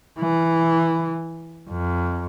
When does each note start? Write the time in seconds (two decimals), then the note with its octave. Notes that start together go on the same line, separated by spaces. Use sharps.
0.19 E3
1.70 F2